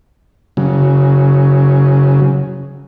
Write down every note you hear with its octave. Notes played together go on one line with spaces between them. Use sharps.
C#3 F#3